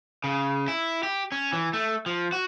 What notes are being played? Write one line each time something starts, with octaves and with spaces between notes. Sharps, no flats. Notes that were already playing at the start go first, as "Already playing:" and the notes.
C#3
E4
G4
C#4
E3
A3
F3
F#4